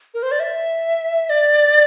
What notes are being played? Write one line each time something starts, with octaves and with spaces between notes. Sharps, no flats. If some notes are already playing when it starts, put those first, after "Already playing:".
A#4
C5
D5
E5
D5